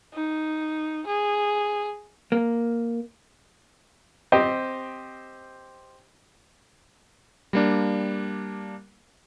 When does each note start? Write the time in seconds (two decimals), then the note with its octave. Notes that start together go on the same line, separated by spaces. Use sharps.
0.13 D#4
1.06 G#4
2.32 A#3
4.32 C4 G4 C5 D#5
7.53 G3 A#3 D4